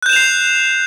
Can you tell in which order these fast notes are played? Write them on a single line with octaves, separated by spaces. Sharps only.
F#6 G6 E7 F7 C7